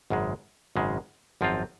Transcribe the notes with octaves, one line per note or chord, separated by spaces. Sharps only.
G#1 F#2 C#3 G#3
G#1 F#2 C#3 G#3
G#1 F#2 F3 C4 F4